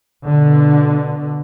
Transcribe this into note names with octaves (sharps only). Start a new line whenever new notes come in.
B2 D3